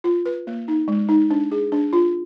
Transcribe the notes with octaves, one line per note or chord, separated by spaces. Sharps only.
F4
B4
A#3
D#4
G#3
D#4
D4
G#4
D4
F4